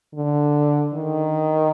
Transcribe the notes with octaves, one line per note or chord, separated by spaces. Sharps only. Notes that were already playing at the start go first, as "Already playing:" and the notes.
D3
D#3